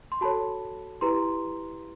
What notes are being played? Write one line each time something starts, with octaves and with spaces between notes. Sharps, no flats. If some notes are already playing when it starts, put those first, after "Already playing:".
C6
F#4 A4 C#5 A5 B5
E4 G4 B4 A#5 C6